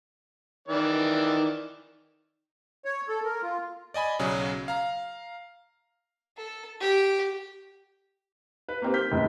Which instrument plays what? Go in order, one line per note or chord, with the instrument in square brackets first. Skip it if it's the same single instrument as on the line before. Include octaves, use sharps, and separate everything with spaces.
[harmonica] D#3 E3 D5
[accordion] C#5
A4
A#4
F4
[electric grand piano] D5 D#5 G#5 B5
B1 C#3 F#3 C#4 G#4
F5 A#5
[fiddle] A4
G4
[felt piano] B4
A#3 C4 G4
F6 G6 B6
F1 A2 C#3